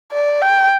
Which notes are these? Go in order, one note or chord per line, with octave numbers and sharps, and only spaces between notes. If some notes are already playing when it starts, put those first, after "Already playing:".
D5
G5